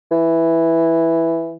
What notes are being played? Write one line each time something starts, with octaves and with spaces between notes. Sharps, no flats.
E3